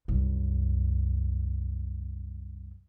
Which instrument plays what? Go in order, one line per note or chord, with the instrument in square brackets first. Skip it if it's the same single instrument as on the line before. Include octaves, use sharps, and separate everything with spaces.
[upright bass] C2 F#2